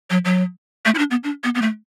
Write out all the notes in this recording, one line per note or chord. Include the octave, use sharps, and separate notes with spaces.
F#3
F#3
A3
E4
D4
B3
D4
B3
B3
A3